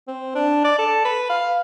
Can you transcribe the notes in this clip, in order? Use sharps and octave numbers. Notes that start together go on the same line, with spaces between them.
C4
D4
D5
A4
B4
F5